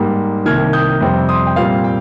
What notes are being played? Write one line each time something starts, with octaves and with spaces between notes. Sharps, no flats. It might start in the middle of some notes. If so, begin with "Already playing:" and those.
Already playing: G#2 G3 A#3
C2 C3 D#3 A#3 F6 G#6
D#6 G6
F2 C3 G3 C4
C6 D#6
G5
A#2 G3 C4 F5
G5